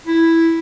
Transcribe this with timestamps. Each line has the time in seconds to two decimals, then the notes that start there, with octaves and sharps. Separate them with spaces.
0.07 E4